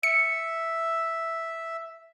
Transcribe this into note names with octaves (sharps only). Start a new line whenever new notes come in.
E5 C#7